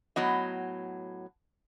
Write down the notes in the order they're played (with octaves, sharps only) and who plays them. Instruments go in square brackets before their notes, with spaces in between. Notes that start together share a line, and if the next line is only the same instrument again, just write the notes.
[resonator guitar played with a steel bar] A2 F#3 B3 D#5